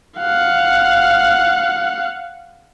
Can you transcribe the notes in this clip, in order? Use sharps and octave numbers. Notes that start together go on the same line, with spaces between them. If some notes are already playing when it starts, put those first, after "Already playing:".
F5 F#5